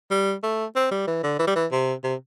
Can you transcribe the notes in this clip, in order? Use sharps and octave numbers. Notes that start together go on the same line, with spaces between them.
G3
A3
C4
G3
E3
D3
E3
G3
E3
C3
C3